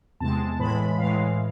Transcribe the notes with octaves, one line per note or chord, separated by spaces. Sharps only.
E2 C3 G#3 A5
A2 E3 G#3 B5
A2 E3 G#3 F5